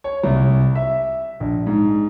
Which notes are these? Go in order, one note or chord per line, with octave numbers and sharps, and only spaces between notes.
C#5
C2
E5
A#1
G#2